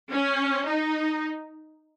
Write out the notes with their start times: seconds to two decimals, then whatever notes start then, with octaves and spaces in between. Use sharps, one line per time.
0.10 C#4
0.65 D#4